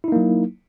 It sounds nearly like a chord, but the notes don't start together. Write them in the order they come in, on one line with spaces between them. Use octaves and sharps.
E4 D#4 A#3 F#3